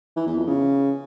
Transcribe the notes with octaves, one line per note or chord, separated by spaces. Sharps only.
E3
E2
F2
C#3